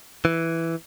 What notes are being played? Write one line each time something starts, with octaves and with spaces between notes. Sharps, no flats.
E3